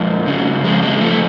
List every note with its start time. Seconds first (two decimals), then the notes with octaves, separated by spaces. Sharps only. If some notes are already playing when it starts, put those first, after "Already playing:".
Already playing: F2 G#3
0.27 C#3
0.64 F2 G#3
0.83 G#3
1.01 F2 A3